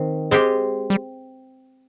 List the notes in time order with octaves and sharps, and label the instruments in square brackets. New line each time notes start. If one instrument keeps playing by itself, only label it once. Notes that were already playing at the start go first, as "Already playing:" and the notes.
Already playing: [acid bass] D#3 [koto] C4
[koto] G#3 C4 G4
[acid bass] G3